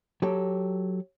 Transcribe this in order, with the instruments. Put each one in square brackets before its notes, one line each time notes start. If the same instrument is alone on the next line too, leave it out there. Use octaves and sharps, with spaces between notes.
[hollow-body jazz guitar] F#3 G4 A4